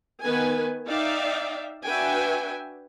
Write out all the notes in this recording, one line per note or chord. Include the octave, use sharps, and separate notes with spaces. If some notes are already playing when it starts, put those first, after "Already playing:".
D#3 B3 B4 G#5
D#4 D5 E5 F5 G5
D4 F#4 B4 E5 G5 G#5